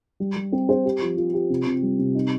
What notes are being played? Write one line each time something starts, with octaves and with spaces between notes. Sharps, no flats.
G3
G3
C4
C5
G4
F3
F3
G4
C3
C3
G3
C3
D#4